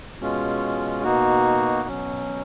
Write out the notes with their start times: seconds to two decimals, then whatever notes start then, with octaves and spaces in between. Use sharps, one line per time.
0.19 B2 G#3 C#4 F4
1.04 B2 A#3 D#4 F#4
1.88 B2 F#3 C#4